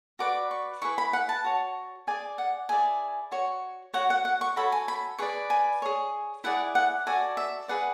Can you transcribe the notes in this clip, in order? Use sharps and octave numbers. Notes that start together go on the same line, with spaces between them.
F#4 B4 D5 D6
C#6
E4 G#4 B4 C#6
B5
F#5
A5
F#4 C#5
G#4 D5 G#5
F#5
E4 G#4 D5 G#5
F#4 C#5
F#4 C#5 F#5
F#5
F#5
C#6
F#4 A4 C#5 B5
G#5
B5
G#4 B4 D5 C#6
G#5
G#4 C#5
E4 G#4 D5 F#5
F#5
F#4 A4 D5 G#5
E5
G#4 B4 D5 F#5